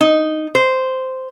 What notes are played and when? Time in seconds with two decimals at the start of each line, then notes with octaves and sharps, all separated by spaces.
0.01 D#4
0.55 C5